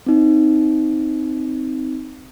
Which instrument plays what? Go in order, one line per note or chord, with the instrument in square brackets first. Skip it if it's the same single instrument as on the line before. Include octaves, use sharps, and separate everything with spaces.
[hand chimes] C4 D#4